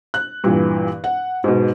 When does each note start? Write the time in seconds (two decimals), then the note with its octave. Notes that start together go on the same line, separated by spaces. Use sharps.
0.14 F#6
0.44 G2 A#2 E3
1.04 F#5
1.44 G#2 B2